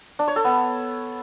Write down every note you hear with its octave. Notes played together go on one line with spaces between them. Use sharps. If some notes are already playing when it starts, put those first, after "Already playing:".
D4
C#5
A4
B3